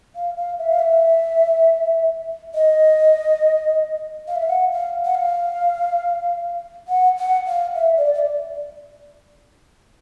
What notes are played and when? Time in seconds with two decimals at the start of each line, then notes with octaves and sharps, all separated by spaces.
0.15 F5
0.37 F5
0.59 E5
0.69 F5
0.79 E5
2.54 D#5
4.27 F5
4.35 E5
4.42 F5
4.49 F#5
4.72 F5
5.05 F#5
5.14 F5
6.88 F#5
7.17 F#5
7.46 F5
7.75 E5
7.97 D5
8.14 D5